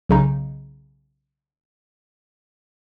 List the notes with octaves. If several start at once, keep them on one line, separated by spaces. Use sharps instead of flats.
B1 C#3 D#4